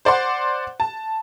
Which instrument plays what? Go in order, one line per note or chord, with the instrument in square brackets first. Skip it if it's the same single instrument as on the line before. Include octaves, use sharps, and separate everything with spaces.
[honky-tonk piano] C5 D5 F#5 C6
A5